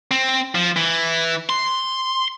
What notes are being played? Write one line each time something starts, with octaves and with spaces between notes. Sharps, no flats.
C4
F3
E3
C6